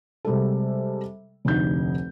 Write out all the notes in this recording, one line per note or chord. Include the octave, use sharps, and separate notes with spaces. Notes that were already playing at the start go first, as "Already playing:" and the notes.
C3 G3 G#3 A4
F1 D2 D#4 G6